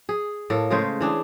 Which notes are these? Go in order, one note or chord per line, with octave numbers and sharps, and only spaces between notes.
G#4
A2 A#3 A4
C#3 G#3 A3 C5
E3 D4 G#4